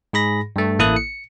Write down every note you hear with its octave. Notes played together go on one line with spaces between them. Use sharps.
G#2 G#4 B5 A#6
G2 A3
A1 A#3 E4 A4 D#6 F#6
C#7